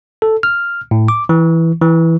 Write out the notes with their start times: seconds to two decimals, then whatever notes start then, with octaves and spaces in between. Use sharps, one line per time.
0.22 A4
0.43 F6
0.91 A2
1.08 D6
1.29 E3
1.82 E3